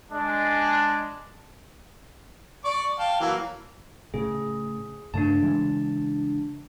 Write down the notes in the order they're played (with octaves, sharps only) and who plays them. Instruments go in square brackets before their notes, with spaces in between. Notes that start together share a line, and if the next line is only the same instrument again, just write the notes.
[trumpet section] G#3 D4
[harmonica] D5 C#6 D6
F5 G5 A5
E3 F#3 A#3
[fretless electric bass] A2 C#3 [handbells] G#4
[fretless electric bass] G2 C#3 A3 [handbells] D4 A5
[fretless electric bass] C#3 E3 G#3